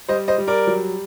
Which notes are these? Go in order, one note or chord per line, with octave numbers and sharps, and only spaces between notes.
G3 C5 D#5
C5 D#5
G3
A#4 D5
F#3